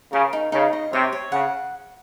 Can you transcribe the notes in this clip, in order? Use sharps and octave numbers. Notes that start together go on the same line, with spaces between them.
C#3 A#4
D#4
C#3 D#4
D#5
C3 C#5
C#5
C#3 F#5